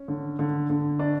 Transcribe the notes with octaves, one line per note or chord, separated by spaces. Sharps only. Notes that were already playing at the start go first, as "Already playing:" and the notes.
Already playing: C#4
D3
D3
D3
D4